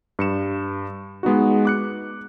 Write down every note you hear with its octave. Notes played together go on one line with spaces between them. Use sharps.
G2 C#7 E7
G#3 B3 D#4 F#4
D6 F#6 C#7